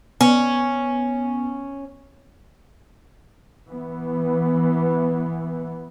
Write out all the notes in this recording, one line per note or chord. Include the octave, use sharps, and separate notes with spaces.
B3 C#4
E3 B3